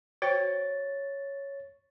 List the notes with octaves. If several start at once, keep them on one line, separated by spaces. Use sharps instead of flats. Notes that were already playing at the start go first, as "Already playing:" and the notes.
F#4 C5 C#5 G5 A6